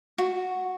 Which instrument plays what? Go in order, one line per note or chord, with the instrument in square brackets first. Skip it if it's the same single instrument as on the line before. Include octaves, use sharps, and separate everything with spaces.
[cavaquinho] F#4